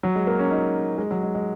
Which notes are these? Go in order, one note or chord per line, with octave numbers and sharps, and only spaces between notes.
F#3
G#3
A#3
C#4
D#4
G#3
F#3
G#3
G#3